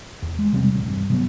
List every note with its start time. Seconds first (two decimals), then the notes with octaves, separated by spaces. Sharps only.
0.22 E2
0.39 G#3
0.53 C3 G3 C4
0.74 D#1 A1
0.88 G2
1.10 B2 F#3 B3